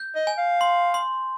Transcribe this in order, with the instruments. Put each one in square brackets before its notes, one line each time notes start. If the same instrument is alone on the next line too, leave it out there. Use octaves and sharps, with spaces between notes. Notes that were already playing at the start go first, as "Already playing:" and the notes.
Already playing: [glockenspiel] G6
[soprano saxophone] D#5
[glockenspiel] G#5
[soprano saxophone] F5
[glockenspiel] C6
C6